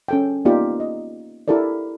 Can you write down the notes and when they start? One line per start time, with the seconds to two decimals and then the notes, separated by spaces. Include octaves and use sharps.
0.08 C#4 A4 G5
0.45 A#3 B3 D#4 F4 G4 D5
0.80 D#5
1.48 E4 G4 A4 A#4 D5